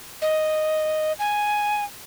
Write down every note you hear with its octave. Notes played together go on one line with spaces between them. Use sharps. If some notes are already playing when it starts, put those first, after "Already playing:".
D#5
G#5